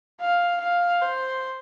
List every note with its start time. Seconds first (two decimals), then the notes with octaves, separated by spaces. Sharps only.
0.20 F5
0.60 F5
1.01 C5